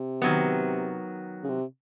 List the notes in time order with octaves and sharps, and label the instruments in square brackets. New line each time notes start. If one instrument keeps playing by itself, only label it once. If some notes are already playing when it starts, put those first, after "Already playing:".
Already playing: [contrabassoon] C3
[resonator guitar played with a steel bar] D#3 F#3 B3
[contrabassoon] C#3
C3